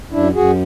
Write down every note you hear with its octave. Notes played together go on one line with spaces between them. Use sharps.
F#2 D4 E4
F#2 F#4 G#4